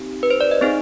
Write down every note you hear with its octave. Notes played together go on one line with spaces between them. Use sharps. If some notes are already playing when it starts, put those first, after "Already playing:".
Already playing: C4 D#4 G4
B4
C5
D5
D#5
C4 D#4 G#4 C5